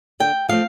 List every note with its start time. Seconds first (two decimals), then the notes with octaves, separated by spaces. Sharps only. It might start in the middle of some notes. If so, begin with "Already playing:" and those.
0.20 D3 G5
0.49 F3 A3 C4 F5